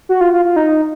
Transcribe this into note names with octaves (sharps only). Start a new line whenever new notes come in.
F#4
F4
F4
F4
D#4